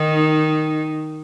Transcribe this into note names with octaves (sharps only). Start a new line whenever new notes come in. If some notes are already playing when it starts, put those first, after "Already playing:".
Already playing: D#3 D#4